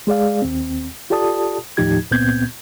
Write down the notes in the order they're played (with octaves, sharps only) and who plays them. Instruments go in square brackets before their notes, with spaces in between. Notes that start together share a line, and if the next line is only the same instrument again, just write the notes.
[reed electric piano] G#3 G#4 D5 F5
D#2 C4
F4 G4 A4 D5 A5 D#6
D#2 A2 F3 D#4 G4 G#6
C#2 A#2 B3 C4 G6 G#6